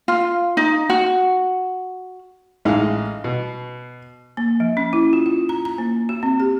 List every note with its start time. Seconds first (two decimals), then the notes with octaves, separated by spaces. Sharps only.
0.08 F4
0.57 D#4
0.90 F#4
2.65 A1 G#3 D#4 F5
3.24 B2
4.37 A#3
4.60 F3
4.77 C#4
4.93 E4
5.13 F4
5.26 F4
5.49 A#5
5.65 A#5
5.78 A#3
6.09 F#4
6.23 C4
6.40 G4